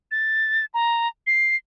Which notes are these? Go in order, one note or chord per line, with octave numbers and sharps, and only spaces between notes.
A6
A#5
C7